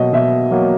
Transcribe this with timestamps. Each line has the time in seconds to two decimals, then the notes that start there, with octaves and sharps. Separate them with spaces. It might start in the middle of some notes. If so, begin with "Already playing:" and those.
Already playing: B2 F#3 A#3 D#5
0.13 B2 E5
0.51 F#3 A#3